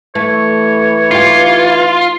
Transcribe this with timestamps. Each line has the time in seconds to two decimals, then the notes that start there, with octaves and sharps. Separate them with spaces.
0.15 E3 A3 C#5
1.11 D#4 F4 G4